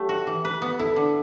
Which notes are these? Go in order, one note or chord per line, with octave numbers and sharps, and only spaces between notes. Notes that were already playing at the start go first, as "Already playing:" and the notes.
Already playing: F#3 A3 G4
F#4
E3
B4
B3
E4 A4
D3